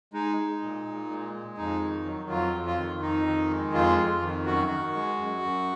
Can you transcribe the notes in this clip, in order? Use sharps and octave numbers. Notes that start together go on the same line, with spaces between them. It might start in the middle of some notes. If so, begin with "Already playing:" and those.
G#3 D#4
G#3
A#2
A#2
G#3
G#3
F2 D#4
D#3
F#3
F2 F4
F2
F4
D#3
F2 D#4
D#3
G#3
F2 F4
F2
D#3
F#2 F#4
D#3
G#3
F#2
F#2